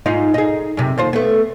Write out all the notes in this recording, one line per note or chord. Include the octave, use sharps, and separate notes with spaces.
G#2 D#4 F4
D#4 G#4
F#2 C3
D#2 F4 C5
A3 B3